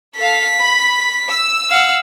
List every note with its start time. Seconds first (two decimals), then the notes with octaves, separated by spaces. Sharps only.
0.17 A4 F5 B6
0.59 B5
1.29 E6
1.70 F5 F#5